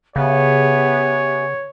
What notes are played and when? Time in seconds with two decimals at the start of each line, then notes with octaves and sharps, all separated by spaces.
0.16 C#3 B3 G4 C#5 E5 G#5